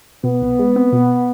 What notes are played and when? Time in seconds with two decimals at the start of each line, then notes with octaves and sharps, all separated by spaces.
0.24 B2 B3
0.42 C2
0.59 G#3
0.76 C4
0.93 B2